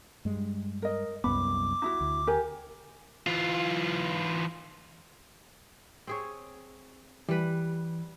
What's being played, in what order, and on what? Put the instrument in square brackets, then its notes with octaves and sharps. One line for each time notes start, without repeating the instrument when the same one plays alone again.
[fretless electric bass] G2 G#3
[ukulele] A#4 D#5
[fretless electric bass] C2 F#2 B3 [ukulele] B5 [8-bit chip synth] D6
[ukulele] D#4 E4 F#4
[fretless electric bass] D2
[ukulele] G4 A#4 G#5
[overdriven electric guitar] E3 F4
[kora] C4 G#4 C#5
[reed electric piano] E3 [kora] G3 B4